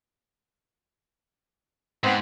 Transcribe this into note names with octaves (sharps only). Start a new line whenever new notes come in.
G#2 B3 C4